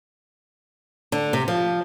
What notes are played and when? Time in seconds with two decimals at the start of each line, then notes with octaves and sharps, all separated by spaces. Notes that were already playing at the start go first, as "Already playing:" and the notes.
1.12 D3
1.33 C3
1.48 F3